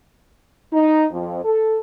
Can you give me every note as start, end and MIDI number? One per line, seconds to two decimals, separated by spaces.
0.72 1.05 63
1.11 1.41 41
1.43 1.77 69